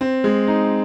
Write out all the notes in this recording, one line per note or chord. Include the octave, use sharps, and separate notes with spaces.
C4
G#3
D#4